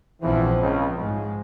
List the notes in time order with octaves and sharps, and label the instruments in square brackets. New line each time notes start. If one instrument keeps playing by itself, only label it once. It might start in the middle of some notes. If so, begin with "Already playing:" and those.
[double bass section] A#1 G#2 F3 C4 [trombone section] E2 E3
[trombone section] C#2 C#3
[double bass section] G#2 F3 G#3